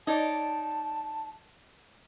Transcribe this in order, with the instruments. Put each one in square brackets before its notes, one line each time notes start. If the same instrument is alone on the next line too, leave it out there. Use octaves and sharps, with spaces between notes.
[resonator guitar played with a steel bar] D#4 C#5 D5 [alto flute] A5